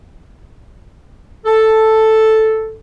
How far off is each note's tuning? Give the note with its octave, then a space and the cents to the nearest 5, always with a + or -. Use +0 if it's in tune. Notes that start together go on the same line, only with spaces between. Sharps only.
A4 +0